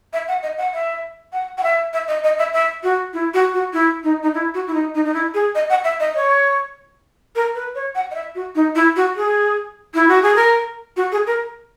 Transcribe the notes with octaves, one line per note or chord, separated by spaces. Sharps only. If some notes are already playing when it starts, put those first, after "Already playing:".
E5
F#5
D#5
F#5
E5
F#5
F#5
E5
E5
D#5
D#5
E5
E5
F#4
E4
F#4
F#4
E4
D#4
D#4
E4
F#4
E4
D#4
D#4
D#4
E4
G#4
D#5
F#5
E5
D#5
C#5
A#4
B4
C#5
F#5
D#5
E5
F#4
D#4
E4
F#4
G#4
E4
F#4
G#4
A#4
F#4
G#4
A#4